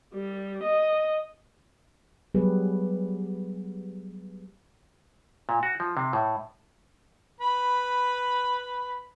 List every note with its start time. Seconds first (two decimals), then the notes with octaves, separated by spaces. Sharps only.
0.14 G3
0.63 D#5
2.34 F#3 G3 B3 G4 G#4 B4
5.49 A#2
5.63 F#4
5.80 F3
5.97 C3
6.13 A2
7.41 B4 B5